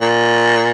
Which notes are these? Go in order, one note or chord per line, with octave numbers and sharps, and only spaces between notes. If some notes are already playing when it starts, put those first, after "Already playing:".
A#2